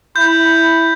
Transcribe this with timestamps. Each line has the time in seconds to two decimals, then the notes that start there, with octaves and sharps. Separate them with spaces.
0.16 E4 B5 G6